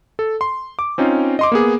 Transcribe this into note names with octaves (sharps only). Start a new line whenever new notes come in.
A4
C6
D6
C4 C#4 D#4 F4
D#5 C6 D6
A#3 B3 G#4